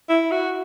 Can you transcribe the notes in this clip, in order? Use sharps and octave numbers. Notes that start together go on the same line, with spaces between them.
E4
F#4